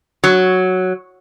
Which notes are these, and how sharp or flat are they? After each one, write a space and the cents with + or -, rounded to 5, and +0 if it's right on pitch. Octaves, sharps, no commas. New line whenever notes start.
F#3 +0